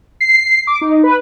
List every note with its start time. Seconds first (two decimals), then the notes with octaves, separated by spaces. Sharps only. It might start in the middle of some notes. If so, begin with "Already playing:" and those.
0.21 C7
0.67 D6
0.81 D#4
1.03 B4